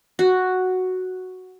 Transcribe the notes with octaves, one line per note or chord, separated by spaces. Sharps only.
F#4